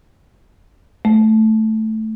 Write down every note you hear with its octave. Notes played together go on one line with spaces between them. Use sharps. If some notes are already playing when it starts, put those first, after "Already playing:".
A3